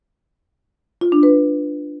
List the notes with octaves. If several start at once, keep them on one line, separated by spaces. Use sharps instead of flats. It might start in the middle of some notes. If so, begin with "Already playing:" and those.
F4
D4
B4